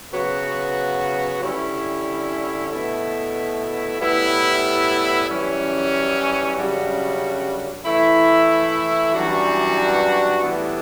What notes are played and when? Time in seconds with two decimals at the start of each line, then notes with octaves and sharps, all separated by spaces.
0.12 C#3 F#3 B3 F#4
1.41 D3 G3 C#4 E4
2.69 B2 A3 E4
3.99 A2 G3 B3 E4
5.28 F#2 E3 G3 C#4
6.57 F#2 C#3 G3 D4 F#4
7.85 E3 A3 E4
9.14 F#2 E3 G3 D4 F#4
10.43 A2 E3 G3 B3 D4